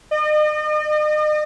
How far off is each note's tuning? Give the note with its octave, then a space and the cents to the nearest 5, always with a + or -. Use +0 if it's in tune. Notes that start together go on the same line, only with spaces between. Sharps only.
D#5 -40